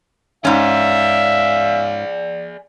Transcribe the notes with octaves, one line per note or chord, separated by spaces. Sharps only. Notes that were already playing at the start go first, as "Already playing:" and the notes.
G#2 C#4 G#4 D5 E5 F5